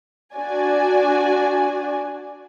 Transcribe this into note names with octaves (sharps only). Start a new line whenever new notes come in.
D4 F#4 D5 G#5